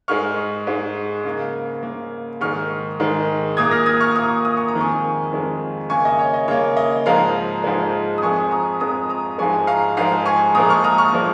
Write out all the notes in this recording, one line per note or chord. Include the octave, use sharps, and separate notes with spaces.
G#2 G#3 C#6 F6
G#2 G#3
C#3 A#3
C#3 A#3
G#2 D#3 G#3 C#6 F6
G#2 D#3 G#3
A#2 A#3 D#6 G#6
F6 A#6
D#6 G#6
C#6 F6
A#2 A#3 A#5 D#6
D#6
C#6
A#5
F2 D#3 G#3
G#5 C#6
F2 D#3 G#3
C#3 A#3 G#5 C#6
D#5
C#5
D#5
C#3 A#3 C#5
D#5
G#2 F3 G#3 F5 A#5
G#2 F3 G#3
D#6
F2 F3 G#3 G#5 C#6
A#5 D#6
F2 F3 G#3 A#5 D#6
A#5 D#6
G#2 F3 G#3 G#5 C#6
F5 A#5
G#2 F3 G#3 F5 A#5
G#5 C#6
A#2 F3 G#3 A#5 D#6
C#6 F6
A#5 D#6
C#6 F6
A#2 F3 G#3